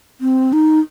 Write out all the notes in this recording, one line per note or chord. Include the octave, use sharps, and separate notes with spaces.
C4
D#4